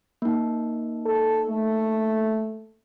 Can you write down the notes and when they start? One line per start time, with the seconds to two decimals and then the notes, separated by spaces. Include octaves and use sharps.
0.22 A#3 D#4
1.06 A4
1.49 A3